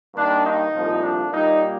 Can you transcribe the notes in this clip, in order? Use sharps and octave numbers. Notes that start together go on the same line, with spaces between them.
G2 D#3 A#3 D4
D#4
C2 A#2 F3 A3
D4
A#2 G3 A#3 D#4